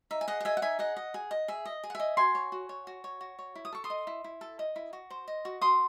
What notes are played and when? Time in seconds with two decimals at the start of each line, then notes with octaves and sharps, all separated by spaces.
0.11 D#4 E5
0.21 G#5
0.28 G#4 D#5 F#5
0.40 F#5
0.45 D#5 E5 G#5
0.57 F#5
0.62 D#4 E5 G#5
0.79 G#4 D#5 F#5
0.97 D#5
1.14 G#4
1.31 D#5
1.48 G#4 E5
1.66 D#5
1.84 G#4
1.90 F#5
1.95 D#5 E5 G#5
2.17 F#4 G#5 C6
2.35 C#5
2.52 F#4
2.69 C#5
2.87 F#4
3.04 C#5
3.21 F#4
3.39 C#5
3.56 E4
3.65 D#6
3.73 A4 C#6
3.84 C6 D#6
3.90 D#5
4.07 E4
4.24 E4
4.41 A4
4.59 D#5
4.76 E4
4.93 F#4
5.11 C5
5.28 D#5
5.45 F#4
5.61 F#4 C6 D#6